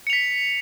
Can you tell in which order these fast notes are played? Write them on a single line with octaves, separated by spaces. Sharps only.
C#7 F7 B6